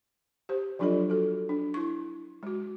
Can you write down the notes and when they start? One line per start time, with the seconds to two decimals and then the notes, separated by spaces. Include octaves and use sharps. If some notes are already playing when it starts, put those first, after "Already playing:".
0.49 G4 C5
0.79 F3 F#3 D4 F4 A4 D#5
1.10 F#4 A4
1.49 D4
1.74 E4 C#6
2.43 G#3 F#4